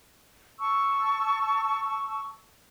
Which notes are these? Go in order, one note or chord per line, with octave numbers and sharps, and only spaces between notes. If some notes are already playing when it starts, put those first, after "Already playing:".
A5 C#6 E6